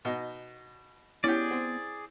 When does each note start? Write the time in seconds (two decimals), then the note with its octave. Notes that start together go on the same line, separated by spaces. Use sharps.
0.05 B2 D#4
1.24 B3 C#4 E4 G4 G#4 D5
1.51 C4